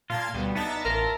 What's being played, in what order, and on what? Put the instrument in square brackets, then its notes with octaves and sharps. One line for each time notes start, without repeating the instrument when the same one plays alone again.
[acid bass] A#2 [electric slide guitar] A#3 F4 [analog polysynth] F5 A5 G#6
[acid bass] D2 [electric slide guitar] B2 [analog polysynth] G3 B3
[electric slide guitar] B3 D4 [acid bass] D#4 [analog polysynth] E5 A5 A#5
[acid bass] A1 [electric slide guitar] F4 [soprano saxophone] A#4